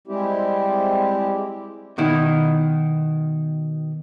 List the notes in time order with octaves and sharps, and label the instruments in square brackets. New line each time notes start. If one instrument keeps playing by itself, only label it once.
[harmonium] G3 G#3 C4 E4 G4
[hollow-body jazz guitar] B2 D#3 E4